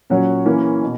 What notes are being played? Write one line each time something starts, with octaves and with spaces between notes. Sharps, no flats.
A#2 F#3 C#4 F#4 C#5
E3 A#3 C#4
B2